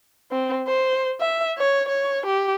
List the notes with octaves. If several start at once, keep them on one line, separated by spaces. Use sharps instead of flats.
C4
C5
E5
C#5
C#5
G4